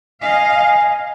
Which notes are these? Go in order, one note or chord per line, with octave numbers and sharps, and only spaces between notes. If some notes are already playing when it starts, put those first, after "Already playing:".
D#5 F5 G#5